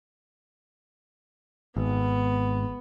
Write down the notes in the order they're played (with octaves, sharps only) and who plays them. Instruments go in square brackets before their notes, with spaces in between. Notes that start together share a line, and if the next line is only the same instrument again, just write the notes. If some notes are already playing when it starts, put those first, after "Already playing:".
[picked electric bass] G#1 [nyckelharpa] B3